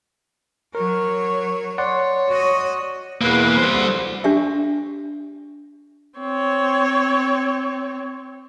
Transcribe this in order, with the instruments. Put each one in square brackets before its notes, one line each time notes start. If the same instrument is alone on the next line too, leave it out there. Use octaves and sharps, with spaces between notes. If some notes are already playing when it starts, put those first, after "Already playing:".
[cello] F#3 C#5 [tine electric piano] A#4
[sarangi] C#5 [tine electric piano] D5 F#5 C6
[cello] F#4 D#5
[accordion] E2 B4 [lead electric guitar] B2 A#3
[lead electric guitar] G3 C5
[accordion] D2 D3
[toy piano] D4 G4 E5
[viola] C4 C#5